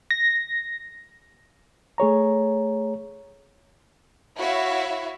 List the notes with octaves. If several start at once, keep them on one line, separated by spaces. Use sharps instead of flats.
A#6
A3 G#4 C#5 A#5
E4 F#4 C#5 E5 F5